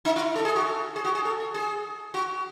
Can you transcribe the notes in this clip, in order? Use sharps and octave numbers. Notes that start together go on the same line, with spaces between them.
D#4
E4
A4
G#4
F#4
A4
G#4
F#4
G#4
A4
A4
G#4
F#4